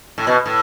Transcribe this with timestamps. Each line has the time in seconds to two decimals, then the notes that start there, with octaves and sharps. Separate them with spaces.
0.18 A2
0.27 B2
0.46 A2